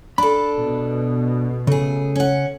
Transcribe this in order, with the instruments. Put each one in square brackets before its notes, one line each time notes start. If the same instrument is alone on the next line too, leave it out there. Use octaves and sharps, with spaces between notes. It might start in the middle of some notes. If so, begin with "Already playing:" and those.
[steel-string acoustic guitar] D4 A4 [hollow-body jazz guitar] B5
[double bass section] B2
[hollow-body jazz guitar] C#3 [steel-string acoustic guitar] A3 G#4
[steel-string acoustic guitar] C#4 F#5